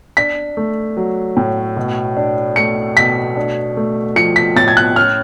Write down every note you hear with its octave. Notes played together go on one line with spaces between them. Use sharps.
D4 B6
A3
F#3
A2
B2
D4
A3 C#7
B2 B6
D4
A3
F3 C#7
B6
A2 A6
G#6
F#6
C#4 F6